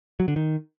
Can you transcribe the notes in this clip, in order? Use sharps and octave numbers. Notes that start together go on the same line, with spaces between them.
F#3
D3
D#3